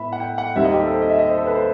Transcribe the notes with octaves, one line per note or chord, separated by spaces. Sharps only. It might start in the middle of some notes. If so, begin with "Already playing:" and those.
Already playing: A2 B3 E5 B5
F#5
G5
F#5
D#2 D#3 G3 C4 E5
D#5
G4
A4
C5
D#5
E5
D#5
C5
A4
B4
C5